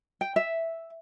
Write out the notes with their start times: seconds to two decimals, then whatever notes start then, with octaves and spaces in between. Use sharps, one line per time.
0.21 G5
0.36 E5